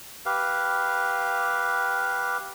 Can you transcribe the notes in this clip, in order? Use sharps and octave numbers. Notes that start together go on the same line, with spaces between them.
G4 B4 F5